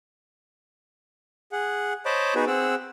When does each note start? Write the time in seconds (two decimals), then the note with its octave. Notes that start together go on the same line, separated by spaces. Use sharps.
1.52 G#4 F#5
2.05 C5 C#5 D#5 A5 B5 D6
2.35 B3 D#4 F#4 G#4 B4
2.47 C4 G#4 F#5 E6